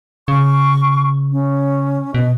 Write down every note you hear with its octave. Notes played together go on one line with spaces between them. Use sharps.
C#3 C#6
C#4
B2 D#5